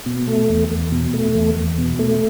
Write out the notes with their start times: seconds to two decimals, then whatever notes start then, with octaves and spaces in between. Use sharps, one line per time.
0.06 B2
0.27 A3
0.49 E2
0.71 E2
0.92 B2
1.14 A3
1.35 E2
1.56 E2
1.78 B2
1.99 A3